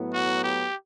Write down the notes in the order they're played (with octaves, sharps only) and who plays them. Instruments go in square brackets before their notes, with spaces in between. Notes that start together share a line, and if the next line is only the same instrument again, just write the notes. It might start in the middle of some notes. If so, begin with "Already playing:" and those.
Already playing: [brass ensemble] A2 F#3 B3 E4
[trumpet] F#4
G4